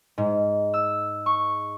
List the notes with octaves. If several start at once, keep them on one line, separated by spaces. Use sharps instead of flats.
G#2
E6
C#6